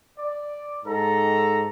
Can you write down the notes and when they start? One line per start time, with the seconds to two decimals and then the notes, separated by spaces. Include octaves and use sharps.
0.19 D5
0.85 G#2 A4 A#5